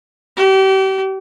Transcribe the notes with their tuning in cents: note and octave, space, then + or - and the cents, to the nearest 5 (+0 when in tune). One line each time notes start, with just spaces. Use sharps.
G4 -35